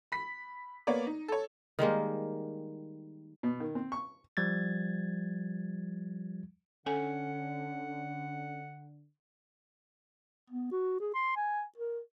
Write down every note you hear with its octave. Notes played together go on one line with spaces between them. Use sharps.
B5 B6
A#3 B3 C#5 D5
D#4
A4 C#5
D#3 G3 G#3 A#3
B2
D#3
C4
C#6
F3 G3 G#6 A6
D3 C#4 A4 F#5 G#5
B3
F#4
G#4
C6
G#5
A#4